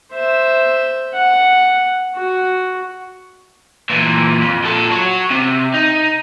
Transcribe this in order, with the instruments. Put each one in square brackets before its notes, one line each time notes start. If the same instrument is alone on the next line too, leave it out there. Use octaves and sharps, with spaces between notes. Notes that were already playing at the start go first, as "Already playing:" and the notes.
[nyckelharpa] C5 E5
F#5
F#4
[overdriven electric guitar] A#2 E3
F2
A#2 A4
F#4 C#5
C3
D#4